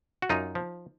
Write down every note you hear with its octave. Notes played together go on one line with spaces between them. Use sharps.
F#4
F#2 D#4 F4
F3